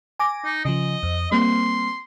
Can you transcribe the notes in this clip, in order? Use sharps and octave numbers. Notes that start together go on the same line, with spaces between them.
G#5 D6 A#6
D#4
C#3 F3 D#5
F2
G3 A#3 C4 C6